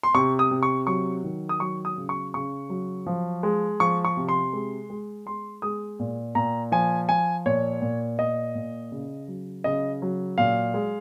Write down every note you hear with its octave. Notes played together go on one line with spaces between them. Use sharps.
C6
C3 C#6
D#6
C3
C#6
F#3 C#6
D#3
D#6
F#3 C#6
D#6
C#3
C#6
C#3 C#6
F#3
F3
G#3
F3 C#6
C#6
C3
C6
G#3
G#3
G#3 C6
G#3 D#6
A#2
A#2 A#5
F3 G#5
F3 G#5
A#2 C#5
A#2
A#2 D#5
A#2
C#3
F#3
C#3 D#5
F#3
A#2 F5
G#3